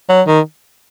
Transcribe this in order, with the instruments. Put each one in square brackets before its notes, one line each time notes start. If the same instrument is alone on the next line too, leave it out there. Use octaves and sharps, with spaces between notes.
[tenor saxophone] F#3
D#3